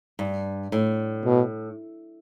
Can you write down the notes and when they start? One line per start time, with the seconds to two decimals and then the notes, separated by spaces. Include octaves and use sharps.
0.19 G2
0.72 A2
1.25 B2